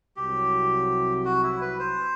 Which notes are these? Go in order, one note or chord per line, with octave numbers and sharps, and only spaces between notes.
C2 C3 F#3 G4
F#4
E4
B4
C5